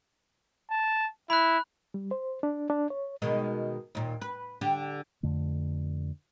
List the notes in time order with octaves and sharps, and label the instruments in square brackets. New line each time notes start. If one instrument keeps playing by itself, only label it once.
[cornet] A5
[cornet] E4 [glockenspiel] B5 F#6
[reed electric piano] G3
C5
D4
D4
C#5
[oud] B2 D#3 G#3
D#2 A#2
B4
D3 G4
[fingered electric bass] F2 D3 A3